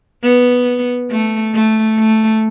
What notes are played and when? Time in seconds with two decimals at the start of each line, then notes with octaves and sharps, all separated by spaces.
0.23 B3
1.11 A3
1.55 A3
1.98 A3